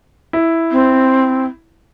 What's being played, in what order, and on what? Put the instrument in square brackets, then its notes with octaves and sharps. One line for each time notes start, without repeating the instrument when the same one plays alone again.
[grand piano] E4
[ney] C4